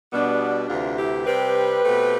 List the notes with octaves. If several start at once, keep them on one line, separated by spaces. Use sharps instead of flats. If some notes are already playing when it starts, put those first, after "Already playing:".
B2 G3 B3 D4
D2 C3 E3 D4 F4
E4 G4
C3 G3 C4 G4 B4
B2 A3 C4